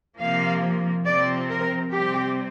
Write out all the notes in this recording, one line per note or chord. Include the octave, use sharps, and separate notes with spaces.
C3 F3 A#3 F5
C3 F3 C4 D5
A#4
C3 G3 C4 G4